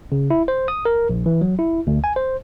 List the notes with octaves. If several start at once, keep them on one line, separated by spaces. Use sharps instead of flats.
C#3
E4
C5
D#6
A#4
A#1
E3
F#3
E4
D2
G#5
C5